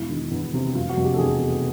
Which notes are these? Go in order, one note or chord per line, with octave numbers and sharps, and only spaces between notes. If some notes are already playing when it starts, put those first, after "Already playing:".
Already playing: E1 E4
D#3
E2
C3
F1 F4
F#4
F1
G4
A4
E2 G#4
B2